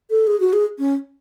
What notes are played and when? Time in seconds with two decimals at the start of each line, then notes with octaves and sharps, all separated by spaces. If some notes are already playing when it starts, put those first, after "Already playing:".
0.11 A4
0.27 G#4
0.40 F#4
0.53 G#4
0.79 C#4